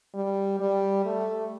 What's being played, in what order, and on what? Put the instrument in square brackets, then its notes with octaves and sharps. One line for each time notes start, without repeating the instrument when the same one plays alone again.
[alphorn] G3
G3
A3